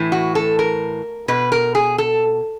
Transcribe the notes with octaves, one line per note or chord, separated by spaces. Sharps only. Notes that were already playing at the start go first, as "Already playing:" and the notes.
Already playing: A2 E3
F#4
A4
A#4
B2 B4
A#4
G#4
A4